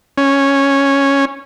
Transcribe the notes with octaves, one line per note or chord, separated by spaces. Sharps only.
C#4